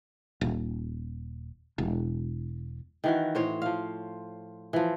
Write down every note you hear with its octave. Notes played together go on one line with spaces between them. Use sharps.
D#1
E1
D#3 E3 F#4
A2 C5 C#5
F3 F5
E3 F3